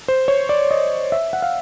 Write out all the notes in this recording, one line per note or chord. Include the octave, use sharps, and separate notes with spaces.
C5
C#5
D5
D#5
E5
F#5
F5